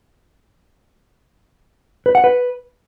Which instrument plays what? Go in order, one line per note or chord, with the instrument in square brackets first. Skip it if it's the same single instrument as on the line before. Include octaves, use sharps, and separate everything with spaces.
[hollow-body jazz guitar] B4
F#5
B4